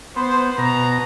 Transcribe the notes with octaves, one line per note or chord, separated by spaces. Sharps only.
B3 C5
B2 A#5